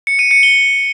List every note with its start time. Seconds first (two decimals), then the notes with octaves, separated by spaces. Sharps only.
0.07 C#7
0.19 D#7
0.31 C#7
0.43 G7